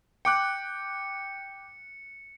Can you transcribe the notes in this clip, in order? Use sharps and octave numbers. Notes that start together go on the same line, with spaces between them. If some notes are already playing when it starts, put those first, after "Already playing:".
G5 D6 F#6 C#7